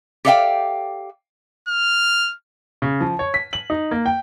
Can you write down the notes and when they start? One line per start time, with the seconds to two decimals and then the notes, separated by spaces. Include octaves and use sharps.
0.25 G4 A4 D5 E5 F5 G5
1.69 F6
2.82 C#3
3.01 F3
3.19 C#5
3.34 B6
3.53 F#7
3.70 D#4
3.91 A#3
4.06 G5